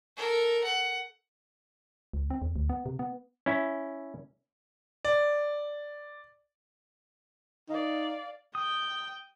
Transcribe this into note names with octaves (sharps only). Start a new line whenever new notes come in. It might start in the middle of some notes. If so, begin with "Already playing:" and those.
A4 A#4
F#5
C#2
C4
E2
D2
B3
C3
B3
C#4 E4
D5
D#4 D5 F5
G5 D#6